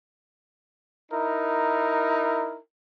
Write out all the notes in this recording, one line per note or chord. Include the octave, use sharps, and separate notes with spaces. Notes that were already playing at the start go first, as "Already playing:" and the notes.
D#4 E4 A#4